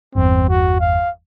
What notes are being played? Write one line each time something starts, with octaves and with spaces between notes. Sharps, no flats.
G1 E2 G2 C4
F#4
F5